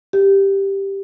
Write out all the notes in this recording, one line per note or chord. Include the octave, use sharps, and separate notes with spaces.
G4